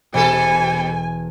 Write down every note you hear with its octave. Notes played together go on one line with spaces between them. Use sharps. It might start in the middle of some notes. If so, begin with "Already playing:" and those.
E1 B2 A4 G#5 C#7